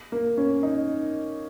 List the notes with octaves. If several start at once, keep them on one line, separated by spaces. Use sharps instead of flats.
A#3
C#4
D#4